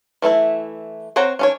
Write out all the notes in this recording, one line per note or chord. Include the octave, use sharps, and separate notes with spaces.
E3 A3 E4 E5
C4 C5 C#5 F#5 A#5
C#4 D4 C#5